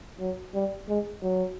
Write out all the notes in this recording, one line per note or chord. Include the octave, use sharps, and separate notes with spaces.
F#3
G3
G#3
F#3